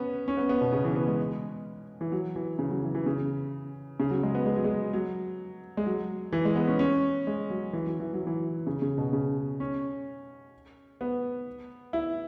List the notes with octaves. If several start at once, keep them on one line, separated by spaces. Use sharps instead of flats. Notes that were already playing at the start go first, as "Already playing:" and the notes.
Already playing: B3 C#4
C#4
B3
B3
B2
C#3
E3
B3
G#3
E3
F#3
E3
C#3
F#3
E3
E3
C#3
C#3
F#3
G#3
B3
G#3
F#3
G#3
F#3
G#3
F#3
E3
G#3
B3
C#4
C#4
G#3
F#3
E3
F#3
E3
F#3
E3
C#3
C#3
B2
C#3
C#4
B3
E4